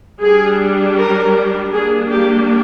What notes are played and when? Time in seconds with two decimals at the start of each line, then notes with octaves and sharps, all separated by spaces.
0.21 G3 D4 G#4
0.97 A#4
1.72 G3 A#3 D4 G#4
2.11 G4